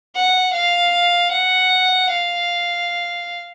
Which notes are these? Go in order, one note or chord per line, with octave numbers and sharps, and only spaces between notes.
F#5
F5
F#5
F5